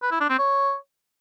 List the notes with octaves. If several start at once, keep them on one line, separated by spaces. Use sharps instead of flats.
B4
E4
D4
C4
C#5